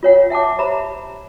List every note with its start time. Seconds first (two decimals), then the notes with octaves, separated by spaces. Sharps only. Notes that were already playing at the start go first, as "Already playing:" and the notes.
0.03 F4 C#5 F#5
0.30 E5 F#5 A5 D6
0.58 G4 C5 E5 A#5 B5